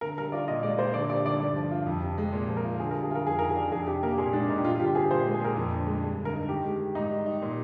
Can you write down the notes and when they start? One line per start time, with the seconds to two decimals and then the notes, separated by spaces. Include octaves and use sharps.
0.01 D3 A#4
0.18 G3 A#4
0.32 F4 D5
0.47 A#2 D#5
0.63 G#3 D5
0.79 A#2 C5
0.94 D3 D5
1.09 G3 D5
1.25 D3 D5
1.40 G2 D5
1.56 F3
1.71 F4
1.86 F2
2.03 C3
2.18 G#3
2.32 A#2
2.48 F3
2.57 A#4
2.64 F4
2.80 D3 G#4
2.91 G3 A#4
3.03 G#4
3.11 F4 A#4
3.26 F2 G#4
3.39 D#3 A#4
3.51 G#4
3.56 D4
3.71 F2 G#4
3.87 C3 G4
4.03 A#3 A#4
4.18 A#2 G#4
4.33 G#3 D4
4.49 A#2 D#4
4.58 G4
4.64 G2 F4
4.75 F4
4.80 D3 G4
4.95 C4 G#4
5.10 A#2 C5
5.26 G#3
5.34 G#4
5.41 A#2 A#4
5.56 F2
5.73 D3
5.87 G#3
6.03 G2
6.18 D3
6.25 A#4
6.33 D#4
6.49 D#3 G4
6.65 G#3
6.79 D#3
6.95 G#2 D#4
7.10 G3
7.26 D#4
7.42 A#2